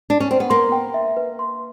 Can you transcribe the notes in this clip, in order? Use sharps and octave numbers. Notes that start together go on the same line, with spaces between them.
D4
C#4
C4
B3
A#3 C6
G5
E5
B4
C6